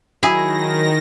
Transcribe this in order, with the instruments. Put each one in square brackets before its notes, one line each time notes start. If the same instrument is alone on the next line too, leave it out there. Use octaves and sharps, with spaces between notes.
[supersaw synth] D#3 A#6 [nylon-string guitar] F#3 F5 [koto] E4 G#4